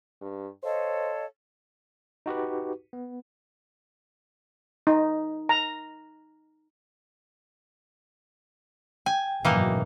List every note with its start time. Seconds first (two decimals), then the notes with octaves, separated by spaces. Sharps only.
0.22 G2
0.63 A4 C5 C#5 D#5 F5
2.26 D#4 F#4 G4 B4
2.93 B3
4.87 D#4
5.49 A#5
9.06 G5 G#5
9.45 G#1 F#2 B2 E3 A#3 D#4